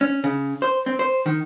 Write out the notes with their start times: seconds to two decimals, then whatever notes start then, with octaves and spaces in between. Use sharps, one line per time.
0.01 C#4
0.24 C#3
0.62 C5
0.86 C4
0.99 C5
1.26 D#3